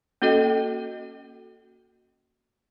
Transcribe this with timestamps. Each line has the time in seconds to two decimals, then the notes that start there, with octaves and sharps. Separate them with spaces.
0.22 A#3 C#4 F#4 A4 D#5 G5